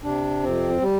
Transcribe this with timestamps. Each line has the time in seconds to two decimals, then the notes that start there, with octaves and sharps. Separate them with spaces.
0.03 C3 D4
0.42 F2 C4
0.81 G3